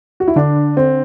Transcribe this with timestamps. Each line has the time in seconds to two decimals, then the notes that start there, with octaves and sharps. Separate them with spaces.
0.20 F#4
0.28 E4
0.36 D3 D4
0.56 D3
0.77 D3 C4